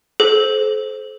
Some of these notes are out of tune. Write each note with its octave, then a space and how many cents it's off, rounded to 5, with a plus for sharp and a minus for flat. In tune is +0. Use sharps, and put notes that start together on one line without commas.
A4 -40 C5 +0